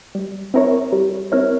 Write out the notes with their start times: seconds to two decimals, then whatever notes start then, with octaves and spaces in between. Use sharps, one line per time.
0.15 G3
0.54 C4 E4 A#4 C#5
0.92 G3
1.32 C4 E4 A#4 C#5